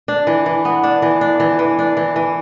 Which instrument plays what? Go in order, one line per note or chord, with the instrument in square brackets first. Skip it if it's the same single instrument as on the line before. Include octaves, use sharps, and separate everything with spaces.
[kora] D4
E3
E3
B3
D4
E3
D4
E3
E3
D4
E3
E3